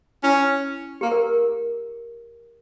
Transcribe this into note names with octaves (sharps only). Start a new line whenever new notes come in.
C#4 E4
A#3 G4
A#4